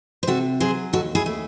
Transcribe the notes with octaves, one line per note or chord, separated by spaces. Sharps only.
C5
C3 F#4 A4
F#3 G#4 C5
D#2 F#4 A4
E4 G#4
A3